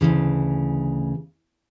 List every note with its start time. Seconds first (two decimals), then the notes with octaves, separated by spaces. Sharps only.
0.01 D2 C#3 E3